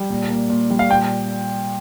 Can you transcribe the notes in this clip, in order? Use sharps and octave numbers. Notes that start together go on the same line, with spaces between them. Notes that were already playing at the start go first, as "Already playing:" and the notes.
Already playing: G3
A#2
A#3
A#2
G3
F5
A#2 G5